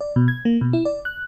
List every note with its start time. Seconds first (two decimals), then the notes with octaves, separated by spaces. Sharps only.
0.01 D5
0.16 B2
0.28 G#6
0.45 A#3
0.61 B2
0.73 E4
0.85 D5
1.05 F#6